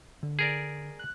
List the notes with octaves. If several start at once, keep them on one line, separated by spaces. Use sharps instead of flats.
D3
G#4 A#4 D5
F#6